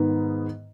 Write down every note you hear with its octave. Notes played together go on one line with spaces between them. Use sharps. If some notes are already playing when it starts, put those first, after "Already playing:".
Already playing: G#2 D#3 B3 D#4